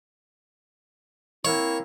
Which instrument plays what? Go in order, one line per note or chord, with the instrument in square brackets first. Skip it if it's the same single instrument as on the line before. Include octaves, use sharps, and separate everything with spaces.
[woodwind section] A#3 C4 E4 [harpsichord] C#5